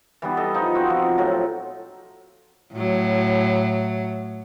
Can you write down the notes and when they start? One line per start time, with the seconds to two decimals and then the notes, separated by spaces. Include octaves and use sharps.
0.22 E3 G3 B3
0.37 A4 D#5
0.54 F3 D#4
0.75 C4 F#4
0.90 F3
1.18 A2 F3 F#3
2.73 A2 F#3